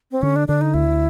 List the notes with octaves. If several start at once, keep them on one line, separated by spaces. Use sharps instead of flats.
C4
D3 C#4
D4
D3 D4
D#4
D2 E4